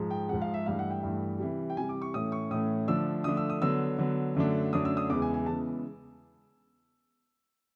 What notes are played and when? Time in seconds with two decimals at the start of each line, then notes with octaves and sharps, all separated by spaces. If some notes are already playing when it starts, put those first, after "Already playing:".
Already playing: G#2 F3 G#3
0.11 G5
0.29 G#2 F3 G#3 F#5
0.42 F5
0.54 E5
0.66 G2 E3 A3 F5
0.79 F#5
0.90 G5
1.03 G2 E3 A3
1.40 C3 E3 G3
1.70 G5
1.77 C3 E3 G3 G#5
1.89 D6
2.02 C#6
2.14 A2 E3 A3 C#4 D#6
2.32 C#6
2.51 A2 E3 A3 C#4 D#6
2.88 D3 F3 A3 D4 E6
3.24 D3 F3 A3 D4 D#6
3.37 E6
3.50 D#6
3.62 D3 F#3 B3 E6
3.98 D3 F#3 B3
4.35 F#2 D3 F#3 A3 D4
4.73 F#2 D3 F#3 A3 D4 D#6
4.85 E6
4.97 D#6
5.10 E2 C#3 E3 G#3 B3 D6
5.22 G#5
5.34 G#5
5.46 C#3 E3 G#3 B3 A5